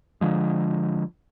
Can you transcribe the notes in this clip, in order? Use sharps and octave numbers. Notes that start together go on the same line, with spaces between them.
D3 F3 G#3